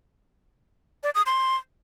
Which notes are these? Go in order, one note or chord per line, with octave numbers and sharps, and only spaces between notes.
D5
D#6
C6